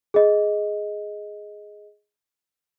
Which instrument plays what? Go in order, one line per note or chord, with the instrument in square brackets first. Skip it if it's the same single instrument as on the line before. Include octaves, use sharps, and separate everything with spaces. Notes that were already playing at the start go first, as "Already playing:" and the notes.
[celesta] G#4 D#5